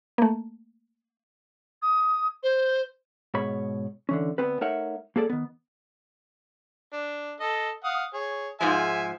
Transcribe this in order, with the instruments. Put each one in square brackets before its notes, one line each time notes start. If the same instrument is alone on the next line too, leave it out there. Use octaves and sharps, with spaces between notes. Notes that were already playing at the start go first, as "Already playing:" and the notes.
[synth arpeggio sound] A3 A#3
[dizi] D#6
C5
[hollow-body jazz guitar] G#2 B2 C#5 B5
D3 E3 C#4
D2 B3 C4 B4
A3 D#4 A#4 C#5 E5 F#5
A#3 G#4 A4 D5
D#3 B3
[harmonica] D4
A4 D#5
F5 F#5 D#6
G#4 C#5
[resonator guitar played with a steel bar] G#2 F3 G#3 [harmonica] E5 G#5